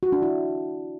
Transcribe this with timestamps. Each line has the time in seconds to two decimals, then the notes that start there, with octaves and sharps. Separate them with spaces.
0.03 F#4
0.12 D4
0.22 E4